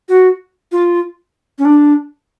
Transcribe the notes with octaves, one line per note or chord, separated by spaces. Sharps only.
F#4
F4
C#4
D4